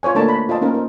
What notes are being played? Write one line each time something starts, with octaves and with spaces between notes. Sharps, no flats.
F4 C5 C#5 G#5
A3 A#3 D4 D#5 A5 A#5
B5
F4 C5 D#5 A5
A#3 C#4 D#4 A#4
D#4 C5